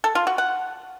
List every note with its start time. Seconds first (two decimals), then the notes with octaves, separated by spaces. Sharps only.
0.04 A4
0.15 F4
0.27 F#4
0.38 F#5